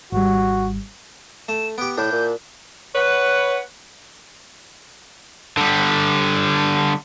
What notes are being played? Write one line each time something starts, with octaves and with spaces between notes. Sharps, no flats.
G#1 G3 F#4
A3 E7
B3 G4 D7
A2 D4 E4 G6
A#2
B4 C#5 F#5
D3 G3